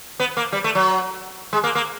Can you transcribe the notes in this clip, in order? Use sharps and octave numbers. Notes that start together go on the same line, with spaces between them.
B3
A#3
G3
A3
F#3
G#3
A#3
A#3